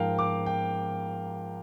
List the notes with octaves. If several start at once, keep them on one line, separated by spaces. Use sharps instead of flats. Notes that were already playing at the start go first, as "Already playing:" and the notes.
Already playing: G#2 F3 A#4 F5 G5
D6
G5